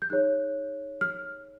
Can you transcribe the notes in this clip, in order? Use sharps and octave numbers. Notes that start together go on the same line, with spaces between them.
G6
D#4 G#4 C#5 F#6
F6